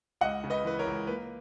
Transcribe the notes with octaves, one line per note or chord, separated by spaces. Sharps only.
C#2 D#5 F#5
C#3
B4 D#5
E3 B4
A#4 C#5
C#2
A#3 B4